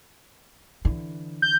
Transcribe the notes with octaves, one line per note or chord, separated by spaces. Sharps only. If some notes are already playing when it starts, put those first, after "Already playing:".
D3 E3
G6